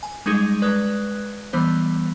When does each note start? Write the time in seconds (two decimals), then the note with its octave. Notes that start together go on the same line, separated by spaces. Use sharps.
0.03 G#5
0.26 G3 G#3 C#4 D#4 G#4
0.62 G#3 B4 D5 F#6
1.53 E3 G3 B3 C5